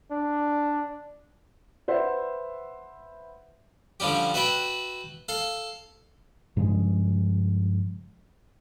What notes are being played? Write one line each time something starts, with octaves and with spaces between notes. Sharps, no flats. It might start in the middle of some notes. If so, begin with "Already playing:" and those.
D4
B4 C5 E5 F#5
D3 F3 G3 C#4 G4
F#4 B4 E5 G5 A5
A4 F5
G2 C#3 F3 G#3